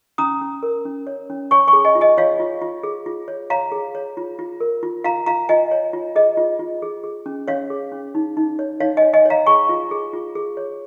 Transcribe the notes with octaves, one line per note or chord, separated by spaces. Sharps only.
C#4 A#5 D#6
C#4
A#4
C#4
C#5
C#4
C#5 G#5 C#6
G#5 C#6
G#4
D#5 G#5
F4
D#5 G#5
F4 C#5 F5
F4
F4
G#4
F4
C#5
C#5 F5 A#5
G#4
C#5
F4
F4
A#4
F4
F4 F5 A#5
F4 F5 A#5
F4 D#5 G#5
C#5
F4
G#4 D#5
F4
F4
G#4
G#4
C#4
C#4 C#5 F5
G#4
C#4
D#4
D#4
C#5
D#4 C#5 F5
D#5 G#5
C#5
D#5 G#5
C#5 F5 A#5
G#4 G#5 C#6
F4
G#4
F4
G#4
C#5